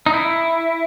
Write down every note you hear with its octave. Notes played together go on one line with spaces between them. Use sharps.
D#4
E4